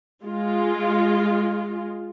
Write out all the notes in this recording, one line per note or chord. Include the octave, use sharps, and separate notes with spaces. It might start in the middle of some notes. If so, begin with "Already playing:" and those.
G#3 F4